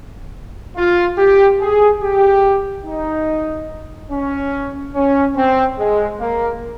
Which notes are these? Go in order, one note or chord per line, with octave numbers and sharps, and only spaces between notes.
F4
G4
G#4
G4
D#4
C#4
C#4
C4
G#3
A#3